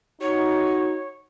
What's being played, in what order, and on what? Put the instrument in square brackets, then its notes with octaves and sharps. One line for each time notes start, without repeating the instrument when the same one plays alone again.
[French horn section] D#4 F#4 [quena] C#5